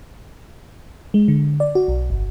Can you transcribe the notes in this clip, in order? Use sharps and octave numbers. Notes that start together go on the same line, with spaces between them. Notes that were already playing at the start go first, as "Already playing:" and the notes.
G#3
D3
D5
F#4
B1
G1